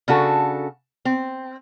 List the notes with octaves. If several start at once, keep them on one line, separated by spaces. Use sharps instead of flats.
C#3 D4 F#4 A4
C4